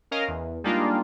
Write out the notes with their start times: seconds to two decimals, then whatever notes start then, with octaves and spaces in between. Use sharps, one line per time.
0.11 C#4 A#4 D#5 F5
0.28 E2
0.64 G3 G#3 A#3 D4 D#4 F4